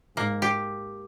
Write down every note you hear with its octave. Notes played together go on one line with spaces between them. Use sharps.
G#2 A#3
G4